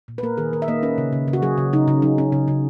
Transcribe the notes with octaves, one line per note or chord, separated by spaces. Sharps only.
A#2
B4
A#3 A#4
D#3 G#4
D#3 A#4
E5
A#3 D#5
C#4 B4
C#3
C#3
C#3
F#4
F#3 G#4
C#3
C#3 D#4
C#3
F#3 D#4
C#4
C#3
C#3